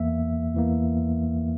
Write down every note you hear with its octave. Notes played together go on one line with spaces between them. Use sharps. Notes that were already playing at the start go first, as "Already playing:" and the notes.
Already playing: E2 E3 A#3 E5
E2 E3 A#3